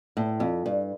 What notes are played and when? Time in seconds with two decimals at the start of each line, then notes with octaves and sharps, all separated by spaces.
0.17 A2
0.40 F2
0.66 G2